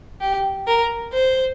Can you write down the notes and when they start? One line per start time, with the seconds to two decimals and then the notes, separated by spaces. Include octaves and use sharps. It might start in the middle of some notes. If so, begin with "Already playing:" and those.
0.21 G4
0.67 A#4
1.13 C5